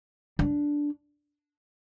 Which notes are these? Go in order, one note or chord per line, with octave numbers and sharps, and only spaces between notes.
D4